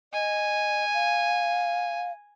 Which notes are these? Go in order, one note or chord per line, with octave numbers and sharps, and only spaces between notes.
D#5 G#5
F5